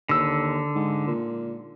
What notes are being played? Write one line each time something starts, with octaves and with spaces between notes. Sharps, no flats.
D#2 D3 E6
G#2
A#2